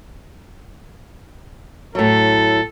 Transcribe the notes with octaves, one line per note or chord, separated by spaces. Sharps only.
A2 F#3 A4